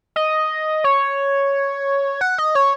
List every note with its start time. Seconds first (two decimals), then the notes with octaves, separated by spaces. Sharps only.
0.16 D#5
0.84 C#5
2.21 F#5
2.38 D#5
2.55 C#5